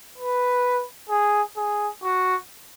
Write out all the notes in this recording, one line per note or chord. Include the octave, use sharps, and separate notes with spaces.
B4
G#4
G#4
F#4